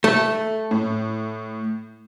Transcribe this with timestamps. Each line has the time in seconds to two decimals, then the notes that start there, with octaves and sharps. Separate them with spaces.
0.04 A3
0.71 A2